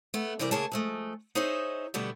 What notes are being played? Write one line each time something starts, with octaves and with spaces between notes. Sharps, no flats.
A3 B3
C3 E3 G3 A#4 D5
C#3 A3 A#3 G#4 C#5 A5
F3 G#3 A3
D#4 G#4 C5 C#5 D#5 E5
B2 D3 G3 A3 B3